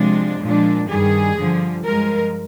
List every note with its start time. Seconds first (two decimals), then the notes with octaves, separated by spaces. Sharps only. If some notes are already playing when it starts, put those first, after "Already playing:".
Already playing: C3 F3 G#3 D4
0.41 A#2 F3 G#3 D4
0.88 G2 D#3 G3 G#4
1.37 G2 D3 F3
1.84 G2 F3 G#3 A#4